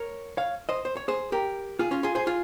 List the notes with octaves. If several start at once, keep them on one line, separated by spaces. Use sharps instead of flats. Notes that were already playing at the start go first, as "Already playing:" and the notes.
Already playing: A#4 C#5
C#5 F5
C5 D#5
C5
C#5
G#4 C5
G4 A#4
F4 G#4
C#4 F4
F4 G#4
G#4 C5
F4 G#4